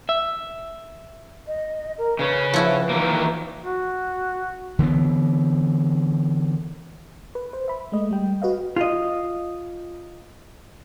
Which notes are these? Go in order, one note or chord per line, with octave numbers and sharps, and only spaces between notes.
E5
D#5
A#4
C#3 C#4 B4
F3 E4 F#4
D#3 E3 A#3
F#4
D3 E3 A3 B3
B4
C5
E5 B5
G#3 A3 D#5
G3 G5
F#4 B4 D#5 F5
F4 D#5